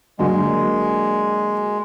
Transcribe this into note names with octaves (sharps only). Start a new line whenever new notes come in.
D3 F#3 G#3 A#3